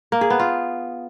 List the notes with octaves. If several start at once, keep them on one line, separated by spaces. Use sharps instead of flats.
A#3
G#4
B3
F4